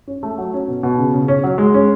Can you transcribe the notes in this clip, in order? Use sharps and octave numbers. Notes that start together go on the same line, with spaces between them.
C#4
A3
F#3
C#4
B2
B2
C#3
C#3
C#4
F#3
G#3
C#4